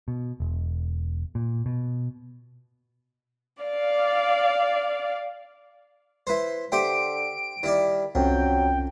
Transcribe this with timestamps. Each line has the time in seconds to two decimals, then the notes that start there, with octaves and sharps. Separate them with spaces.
0.08 B2
0.40 E1
1.35 A#2
1.66 B2
3.62 D5 F5
6.27 E4 B4 C5
6.72 D3 G4 C5 E5 G5 D7
7.63 D#3 G3 E4 D5
8.15 C2 F2 F#3 C#4 G5